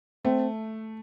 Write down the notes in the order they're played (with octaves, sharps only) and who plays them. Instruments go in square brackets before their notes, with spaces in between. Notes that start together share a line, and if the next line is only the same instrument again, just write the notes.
[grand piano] A3 [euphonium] C4